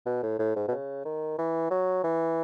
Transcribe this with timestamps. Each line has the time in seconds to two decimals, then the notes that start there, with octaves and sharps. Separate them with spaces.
0.06 B2
0.23 A2
0.39 A2
0.56 G#2
0.68 B2
0.72 C#3
1.05 D#3
1.39 E3
1.71 F#3
2.04 E3